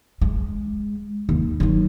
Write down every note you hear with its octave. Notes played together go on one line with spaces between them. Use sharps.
G#3
D#2
D#3 F#3